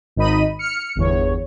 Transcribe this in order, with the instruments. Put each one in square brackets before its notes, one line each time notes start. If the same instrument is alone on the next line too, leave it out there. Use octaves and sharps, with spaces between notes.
[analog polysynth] G#1 D#4 D#5 B5 D#7
F6 C#7
G1 E2 C#5